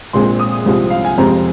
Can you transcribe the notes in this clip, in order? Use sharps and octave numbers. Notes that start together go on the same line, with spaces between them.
A#1 A#2 G#3 C4 C6
D#6
C2 C3 F3 G#3 C4
F5
G#5
F2 C3 G#3 C4 A#5